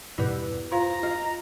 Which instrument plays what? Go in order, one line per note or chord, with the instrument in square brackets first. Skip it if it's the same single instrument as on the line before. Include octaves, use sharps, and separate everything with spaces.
[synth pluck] E2 G2 B2
[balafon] F4 C5 F5 [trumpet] A#5
[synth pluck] F4 [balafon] D#5